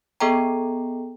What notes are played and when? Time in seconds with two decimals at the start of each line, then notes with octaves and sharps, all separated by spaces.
0.20 B3 G#4 A4 D#5 G5 A#5